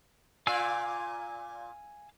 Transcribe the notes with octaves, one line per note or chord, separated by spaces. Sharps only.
A#2 F4 D5 F5 G#5 E6